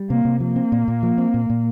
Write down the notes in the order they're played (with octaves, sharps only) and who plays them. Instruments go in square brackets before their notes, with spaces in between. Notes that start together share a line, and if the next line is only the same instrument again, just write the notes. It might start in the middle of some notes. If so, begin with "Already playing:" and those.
Already playing: [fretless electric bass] G3
[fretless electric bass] C3 [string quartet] A#3
[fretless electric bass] C3
[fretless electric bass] F3 [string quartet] A#3
[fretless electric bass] C4
A#2
A#2
F3
C4
A#2
A#2